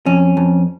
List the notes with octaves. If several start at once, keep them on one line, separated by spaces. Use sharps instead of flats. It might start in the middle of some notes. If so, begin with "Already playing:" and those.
F2 C#4
F2